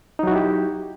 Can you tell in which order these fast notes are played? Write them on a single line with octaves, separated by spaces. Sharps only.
D#4 F#3 F#4 E4 G4